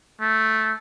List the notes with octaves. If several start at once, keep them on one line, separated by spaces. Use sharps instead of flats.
A3